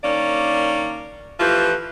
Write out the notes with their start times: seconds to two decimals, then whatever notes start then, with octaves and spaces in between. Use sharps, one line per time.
0.04 D#3 A#3 C#4 D4 D5
1.40 E3 F3 A3 F4 G4 B4